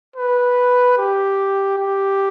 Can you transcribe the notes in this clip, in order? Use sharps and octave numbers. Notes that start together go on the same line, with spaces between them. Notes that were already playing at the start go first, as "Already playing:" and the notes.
B4
G4
G4